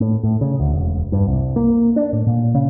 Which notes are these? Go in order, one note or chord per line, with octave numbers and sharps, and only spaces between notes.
A2
A2
C#3
D2
E1
G2
C2
A#3
D4
A2
A#2
C#3